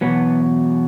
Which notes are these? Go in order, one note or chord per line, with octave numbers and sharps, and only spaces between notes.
E2 B2 F#3 B3